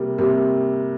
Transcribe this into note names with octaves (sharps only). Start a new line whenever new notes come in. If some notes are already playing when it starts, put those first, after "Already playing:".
Already playing: C3 G3 A#3
C3 G3 A#3